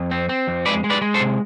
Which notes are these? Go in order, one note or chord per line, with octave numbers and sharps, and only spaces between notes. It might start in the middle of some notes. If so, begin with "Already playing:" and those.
Already playing: F2
C4
C4
F2
G#3 B4 D5
G#3
B4 D5
G#3
A4 C5
C3